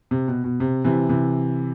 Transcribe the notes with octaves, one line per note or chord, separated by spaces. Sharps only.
C3
B2
B2
C3
C3 E3
C3 E3